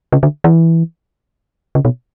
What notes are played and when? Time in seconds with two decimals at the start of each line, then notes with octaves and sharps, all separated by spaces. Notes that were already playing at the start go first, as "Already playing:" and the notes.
0.12 C#3
0.23 D3
0.44 E3
1.75 C#3
1.85 B2